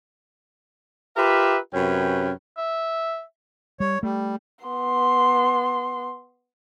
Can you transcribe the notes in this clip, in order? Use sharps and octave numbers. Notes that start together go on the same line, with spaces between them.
F4 G4 A#4 B4 E5
F#2 C3 C#4 B4 G5
E5
G3 C#5
G3 A3
B3 C6